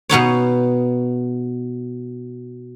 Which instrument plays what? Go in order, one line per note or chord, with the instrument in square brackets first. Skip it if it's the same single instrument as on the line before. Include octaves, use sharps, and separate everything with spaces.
[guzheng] B2 B3 D#4 C#5